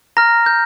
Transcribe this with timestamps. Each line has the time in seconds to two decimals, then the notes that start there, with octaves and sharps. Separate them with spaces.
0.17 A#5 F6 A#6
0.46 G6